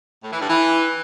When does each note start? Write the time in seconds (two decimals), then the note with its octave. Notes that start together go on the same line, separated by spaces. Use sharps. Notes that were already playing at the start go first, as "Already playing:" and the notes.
0.23 A2
0.32 E3
0.41 G2
0.50 E3